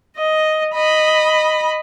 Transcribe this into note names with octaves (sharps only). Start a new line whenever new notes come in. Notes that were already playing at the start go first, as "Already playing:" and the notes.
D#5
D#5 B5